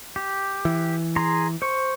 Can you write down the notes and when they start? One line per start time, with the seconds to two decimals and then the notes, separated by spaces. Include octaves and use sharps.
0.16 G4
0.65 E3
1.16 G#4 A#5 C6
1.62 C5 C#6